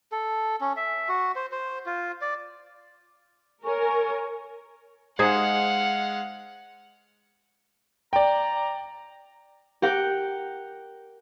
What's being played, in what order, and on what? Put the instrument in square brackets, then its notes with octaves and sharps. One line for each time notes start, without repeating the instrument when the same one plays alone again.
[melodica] A4
C#4
E5
F#4
C5
C5
F4
D5
[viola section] A#4 [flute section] C#5 G#5 C#6
[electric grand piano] G#3 [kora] D#4 G#4 C5 [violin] F5 F#5
[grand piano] D5 G5 [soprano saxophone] A#5
[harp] G4 A#4 F#5 G5